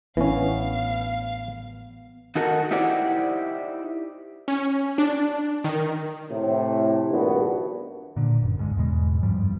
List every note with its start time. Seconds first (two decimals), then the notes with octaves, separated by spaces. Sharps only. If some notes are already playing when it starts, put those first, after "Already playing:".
0.17 A1 E3 B3 C#4 D4 F5
2.35 D#3 D#4 F#4 A4 A#4 F#5
2.71 D#4 E4 G4 C5 D5 F#5
4.48 C#4
4.98 D4
5.64 D#3
6.31 A2 C3
7.10 A#1 G2 D#3 B3 D4 F#4
8.17 A#2 D3
8.43 F#1
8.58 D1 G#2 D3 G#3
8.77 E2 G#2 B2 G#3
9.23 F#1 G2 F3 G3